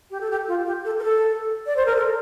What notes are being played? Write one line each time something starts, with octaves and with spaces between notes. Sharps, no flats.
G4
A4
G4
F4
G4
A4
A#4
A4
D5
C5
A#4
A4